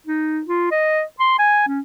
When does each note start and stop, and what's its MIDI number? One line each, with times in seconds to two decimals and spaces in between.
0.07 0.41 63
0.46 0.70 65
0.71 1.02 75
1.20 1.35 84
1.39 1.67 80
1.68 1.80 61